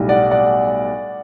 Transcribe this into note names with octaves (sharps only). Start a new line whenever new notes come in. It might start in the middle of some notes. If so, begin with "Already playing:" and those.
Already playing: B1 A2 G3
D5 F#5
D5 F#5